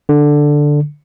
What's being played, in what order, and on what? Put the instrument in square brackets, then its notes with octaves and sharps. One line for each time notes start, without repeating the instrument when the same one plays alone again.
[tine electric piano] D3